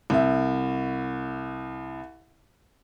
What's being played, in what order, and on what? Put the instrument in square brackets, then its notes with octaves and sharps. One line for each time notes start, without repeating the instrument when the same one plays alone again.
[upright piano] C2 E5